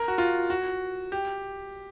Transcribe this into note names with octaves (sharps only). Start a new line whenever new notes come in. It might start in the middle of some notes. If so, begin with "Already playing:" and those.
Already playing: A#4
F#4
F4
F#4
G4